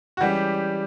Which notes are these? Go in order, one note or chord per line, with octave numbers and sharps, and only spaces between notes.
F#4
E3 G3 G#3 C#4 G4